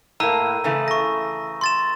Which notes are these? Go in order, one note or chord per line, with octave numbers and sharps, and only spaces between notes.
A2 A#3 A#5 E6 D#7
C#3 E3 A3
C#6 A#6
C6 A6 E7